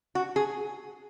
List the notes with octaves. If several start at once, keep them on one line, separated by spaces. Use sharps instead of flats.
F#4
G#4